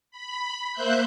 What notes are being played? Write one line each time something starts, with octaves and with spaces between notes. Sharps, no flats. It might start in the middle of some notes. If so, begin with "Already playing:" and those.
B5
A#3 C5 E5 F#6 G6